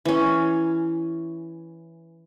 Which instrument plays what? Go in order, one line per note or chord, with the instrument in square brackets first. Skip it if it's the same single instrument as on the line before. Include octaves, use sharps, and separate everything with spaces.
[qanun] E3 C#4